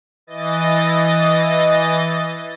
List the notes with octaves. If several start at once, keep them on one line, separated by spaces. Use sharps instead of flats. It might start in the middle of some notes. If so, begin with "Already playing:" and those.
E3 D#5 A6